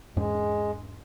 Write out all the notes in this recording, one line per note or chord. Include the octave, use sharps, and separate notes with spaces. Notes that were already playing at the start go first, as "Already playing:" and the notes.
E2 G#2 G#3 C#4